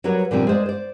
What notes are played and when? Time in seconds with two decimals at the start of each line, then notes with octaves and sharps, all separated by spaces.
0.04 F#3 G3 A#4 B4 C#5
0.31 A#2 D3 F3 G3 C4
0.47 G#3 C5 D5
0.66 C5 D5